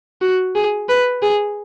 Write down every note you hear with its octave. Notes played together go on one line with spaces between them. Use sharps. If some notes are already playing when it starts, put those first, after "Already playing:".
F#4
G#4
B4
G#4